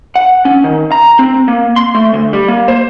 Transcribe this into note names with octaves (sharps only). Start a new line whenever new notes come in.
F#5
C#4
D#3
A#5
C4
A#3
C6
A3
D2
G3
A#3
C5